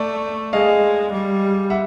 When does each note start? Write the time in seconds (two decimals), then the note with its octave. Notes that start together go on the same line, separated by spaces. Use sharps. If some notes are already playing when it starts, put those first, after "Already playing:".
Already playing: A3 D5
0.53 G#3 D#5 F5
1.12 G3
1.70 E5 F#5